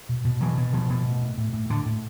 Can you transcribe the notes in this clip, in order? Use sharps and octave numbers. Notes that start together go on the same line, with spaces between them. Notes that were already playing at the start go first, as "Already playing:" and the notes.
B2
B2
B2 E3 F#3
B2
B2 D#3 F3
B2
A2
A2
A2
A2
A2 D3
A2